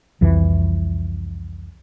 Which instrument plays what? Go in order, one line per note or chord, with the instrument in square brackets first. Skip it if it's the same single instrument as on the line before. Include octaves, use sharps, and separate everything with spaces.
[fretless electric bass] C2 F2 E3